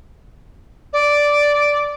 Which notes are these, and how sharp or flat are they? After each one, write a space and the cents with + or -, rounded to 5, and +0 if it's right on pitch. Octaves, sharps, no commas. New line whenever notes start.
D5 -5